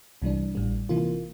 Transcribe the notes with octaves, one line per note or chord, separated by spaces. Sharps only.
C2 C3 E3 G3 D4
A1 A2 G3
C3 E3 A#3 F4